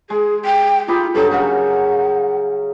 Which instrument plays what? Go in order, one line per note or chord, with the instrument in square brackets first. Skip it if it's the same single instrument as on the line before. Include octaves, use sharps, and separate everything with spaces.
[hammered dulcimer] G#3 [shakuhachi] G#4
[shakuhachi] G5
[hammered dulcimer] D#4 G4 B5 [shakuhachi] F4
[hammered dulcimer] G2 F#3 D#4 [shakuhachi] A4
[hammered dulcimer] C#3 A#4 E5 [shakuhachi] F#5